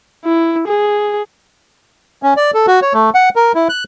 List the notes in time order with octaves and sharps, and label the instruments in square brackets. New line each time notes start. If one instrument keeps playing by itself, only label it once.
[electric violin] E4
G#4
[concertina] C#4
D5
A4
F#4
C#5
A3
F#5
A#4
E4
F#6